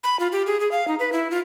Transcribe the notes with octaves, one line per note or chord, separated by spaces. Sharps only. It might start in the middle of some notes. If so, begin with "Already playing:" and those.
B5
F4
G4
G#4
G#4
F5
D#4
B4
E4
F4